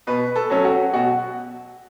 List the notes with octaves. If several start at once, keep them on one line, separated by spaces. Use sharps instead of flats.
B2 B4
A4
F#3 A3 C#4
F#4
B2 F#4